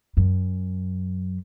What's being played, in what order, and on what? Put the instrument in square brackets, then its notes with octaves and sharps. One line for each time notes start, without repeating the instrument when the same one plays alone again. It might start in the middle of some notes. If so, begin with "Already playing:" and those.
[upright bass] F#2